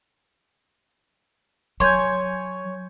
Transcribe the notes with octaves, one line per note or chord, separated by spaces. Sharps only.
F#3 C#5 G#5 C6 G6